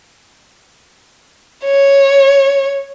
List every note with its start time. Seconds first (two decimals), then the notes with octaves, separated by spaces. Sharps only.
1.65 C#5